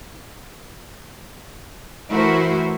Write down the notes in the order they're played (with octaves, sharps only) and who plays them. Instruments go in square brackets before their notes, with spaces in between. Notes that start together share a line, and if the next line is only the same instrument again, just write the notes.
[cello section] E3 A3 E4 F#4 A#4 C5